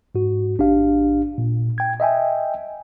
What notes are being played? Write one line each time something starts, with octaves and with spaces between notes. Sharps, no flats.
G#2 F#4
A1 D4 G4 F5
A#2
G5 G#6
D#5 E5 G5 G#5